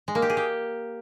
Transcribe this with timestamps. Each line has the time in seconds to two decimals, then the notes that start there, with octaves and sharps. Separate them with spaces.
0.08 G#3
0.15 A#3
0.22 G4
0.30 G#4
0.37 G4